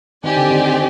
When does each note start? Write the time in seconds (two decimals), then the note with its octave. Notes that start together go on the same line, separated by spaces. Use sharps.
0.24 D#3 C4 G4 D5 G#5
0.36 D3
0.50 D#3